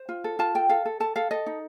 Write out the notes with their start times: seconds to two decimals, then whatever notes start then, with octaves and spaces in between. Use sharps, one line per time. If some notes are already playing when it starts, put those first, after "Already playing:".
Already playing: C5
0.09 F4
0.24 A4
0.39 F4 A5
0.55 A4 G5
0.69 A4 F5
0.85 A4
1.00 A4 A5
1.16 A4 F5
1.31 A4 D#5
1.46 D#4